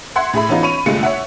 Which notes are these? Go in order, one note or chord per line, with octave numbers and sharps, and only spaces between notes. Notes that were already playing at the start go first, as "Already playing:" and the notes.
E5 F#5 C6 G#6
A2 G#4 E5 B5
E3 B3 C#4 D#4 F4
C#4 B5 C#6 D#7 F7
G1 C3 G#3 A3 F4 C#7
C#5 E5 F#5